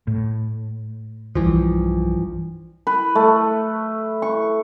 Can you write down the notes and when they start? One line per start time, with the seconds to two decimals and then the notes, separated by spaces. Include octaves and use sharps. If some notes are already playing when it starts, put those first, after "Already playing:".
0.07 A2
1.35 B1 G2 E3 F3
2.87 B4
3.15 A3
4.22 C#6